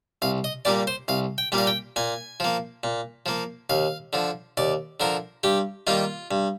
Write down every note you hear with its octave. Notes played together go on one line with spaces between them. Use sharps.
C2 F5
D#5
A#2 G3 A#3 D5
C5
C2 F5
G5
A#2 G3 A#3
F5
G5
A#2 G#5
F3 A#3
A#2
F3 A#3
D#2 F5
D3 F3
D#2 D5
D3 F3 A#4
G2 G4
D#3 G3 A#3 F4
G2